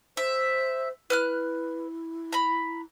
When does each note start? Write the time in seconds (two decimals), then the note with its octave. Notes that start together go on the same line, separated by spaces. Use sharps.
0.17 C5 E5
1.10 E4 B4 F6 F#6
2.33 A#5 B5